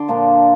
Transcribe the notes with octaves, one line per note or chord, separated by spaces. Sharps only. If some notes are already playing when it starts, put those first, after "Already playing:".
Already playing: D3 C6 D6
A#2 F3 A#3 D4